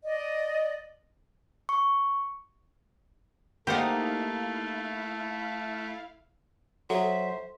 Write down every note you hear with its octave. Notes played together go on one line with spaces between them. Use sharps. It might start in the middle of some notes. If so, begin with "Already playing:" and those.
D5 D#5
C#6
A3 A#3 D#4 E4 G4 C5 F5 F#5
F#3 A4 C5 E5